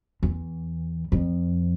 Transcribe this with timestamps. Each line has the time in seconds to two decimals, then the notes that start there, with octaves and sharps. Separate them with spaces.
0.23 E2
1.12 F2